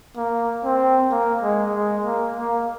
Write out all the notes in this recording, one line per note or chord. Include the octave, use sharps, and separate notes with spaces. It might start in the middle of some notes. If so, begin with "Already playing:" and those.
A#3
C4
A#3
G#3
G#3
A#3
A#3